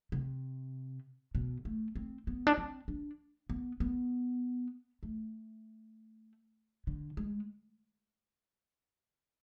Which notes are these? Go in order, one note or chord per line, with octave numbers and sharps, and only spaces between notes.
C3
B2
A3
C4
B3
D4
C4
D4
B3
B3
A3
D3
G#3